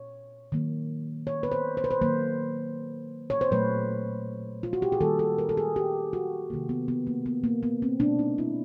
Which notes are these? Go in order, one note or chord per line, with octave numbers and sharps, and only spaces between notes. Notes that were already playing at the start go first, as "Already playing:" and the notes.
Already playing: A#2 C#5
D#3 F#3 A#3
C#5
B4
C5
C5
B4
C5
D#3 F#3 A#3 C5
C#5
C5
A#2 F#3 A3 B4
F4
F#4
G4
G#4
D#3 G3 A#3 A4
A4
A#4
A4
G#4
G4
F#4
C3 D#3 F#3 A#3
B3
B3
A#3
B3
A#3
B3
C4
B2 G#3 D4
D#4
E4